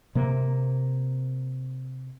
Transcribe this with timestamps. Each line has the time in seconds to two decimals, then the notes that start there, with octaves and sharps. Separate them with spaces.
0.15 C3 A#3